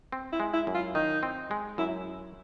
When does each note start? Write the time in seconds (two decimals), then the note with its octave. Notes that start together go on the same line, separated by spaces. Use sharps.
0.12 C4
0.33 E4
0.40 G#3
0.54 E4
0.67 F#2
0.75 F4
0.95 D#3 D#4
1.23 C4
1.51 G#3
1.78 F#2 E4